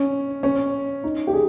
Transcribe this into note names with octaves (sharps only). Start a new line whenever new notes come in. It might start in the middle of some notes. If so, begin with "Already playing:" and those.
Already playing: C#4
C#4
D#4
G4
G#4